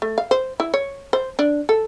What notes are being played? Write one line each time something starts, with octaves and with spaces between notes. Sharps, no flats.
A3
F5
C5
E4
C#5
C5
D4
A4